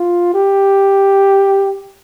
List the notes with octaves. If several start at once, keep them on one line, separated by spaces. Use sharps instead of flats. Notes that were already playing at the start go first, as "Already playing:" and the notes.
Already playing: F4
G4